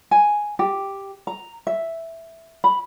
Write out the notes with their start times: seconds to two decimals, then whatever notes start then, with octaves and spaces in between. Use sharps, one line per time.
0.11 G#5
0.59 G4
1.27 A#5
1.67 E5
2.64 B5